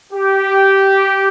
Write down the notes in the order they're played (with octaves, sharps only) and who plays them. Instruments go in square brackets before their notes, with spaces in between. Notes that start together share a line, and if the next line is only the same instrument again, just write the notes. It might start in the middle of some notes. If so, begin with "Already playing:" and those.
[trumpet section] G4